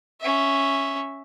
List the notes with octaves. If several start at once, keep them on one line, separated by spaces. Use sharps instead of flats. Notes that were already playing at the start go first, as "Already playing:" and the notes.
C#4 E5